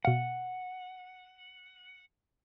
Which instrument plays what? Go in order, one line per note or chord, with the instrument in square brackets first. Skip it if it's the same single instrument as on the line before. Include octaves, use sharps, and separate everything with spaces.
[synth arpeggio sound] B2 F5 [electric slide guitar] F#5